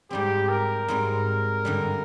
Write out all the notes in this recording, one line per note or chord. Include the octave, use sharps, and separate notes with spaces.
G#2 G3 C4 G4
A#4
G#2 G3 C4
G2 D3 G3